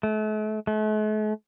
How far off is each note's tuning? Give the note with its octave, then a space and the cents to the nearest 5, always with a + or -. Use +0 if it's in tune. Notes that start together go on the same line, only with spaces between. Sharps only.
A3 -40
A3 -45